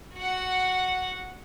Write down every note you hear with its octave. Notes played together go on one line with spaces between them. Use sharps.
F#4 F#5